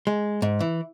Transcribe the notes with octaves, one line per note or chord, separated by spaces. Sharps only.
G#3
G#2
E3